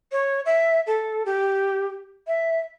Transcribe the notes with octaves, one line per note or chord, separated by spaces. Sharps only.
C#5
E5
A4
G4
E5